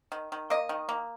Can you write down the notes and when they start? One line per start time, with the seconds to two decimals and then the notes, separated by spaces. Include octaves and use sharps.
0.12 D#3
0.32 D#3
0.50 A#3 D#5
0.69 D#3
0.89 A#3